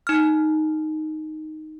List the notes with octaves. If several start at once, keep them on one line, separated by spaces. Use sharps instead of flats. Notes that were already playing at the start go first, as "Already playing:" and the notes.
D#4 F6